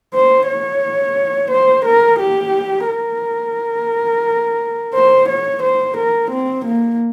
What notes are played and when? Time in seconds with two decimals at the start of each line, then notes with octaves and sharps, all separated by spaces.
0.14 C5
0.48 C#5
1.51 C5
1.85 A#4
2.19 G4
2.88 A#4
4.94 C5
5.29 C#5
5.63 C5
5.97 A#4
6.31 C4
6.66 A#3